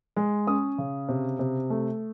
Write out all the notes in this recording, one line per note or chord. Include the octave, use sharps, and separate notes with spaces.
G#3
C#4 D#6
C#3
C3
C3
A3